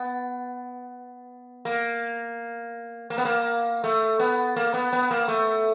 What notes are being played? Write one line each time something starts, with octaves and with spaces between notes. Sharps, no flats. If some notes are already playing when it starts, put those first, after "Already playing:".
Already playing: B3
A#3
A#3
B3
A#3
A3
B3
A#3
B3
B3
A#3
A3